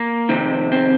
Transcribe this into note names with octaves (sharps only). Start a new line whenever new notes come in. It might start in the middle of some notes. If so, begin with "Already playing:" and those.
Already playing: A#3
F2 C3 D#3 C4
C4